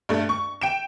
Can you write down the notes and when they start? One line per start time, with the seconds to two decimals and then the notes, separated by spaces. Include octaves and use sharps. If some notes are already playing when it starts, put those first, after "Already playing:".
0.09 G2 A3
0.29 C#6
0.61 G5 D7 E7